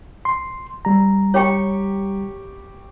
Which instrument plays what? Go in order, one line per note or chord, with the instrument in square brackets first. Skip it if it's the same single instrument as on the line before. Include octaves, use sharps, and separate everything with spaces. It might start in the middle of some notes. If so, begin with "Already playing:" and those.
[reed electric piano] C6
G3 A#5
[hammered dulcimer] G4 C#6 [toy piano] C#5 G5